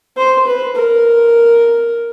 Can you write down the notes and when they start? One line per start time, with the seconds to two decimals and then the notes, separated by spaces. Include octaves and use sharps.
0.17 C5
0.47 B4
0.76 A#4